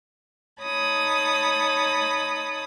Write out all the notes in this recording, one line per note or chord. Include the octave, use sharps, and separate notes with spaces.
D#4 C#5 A5 B5 D#6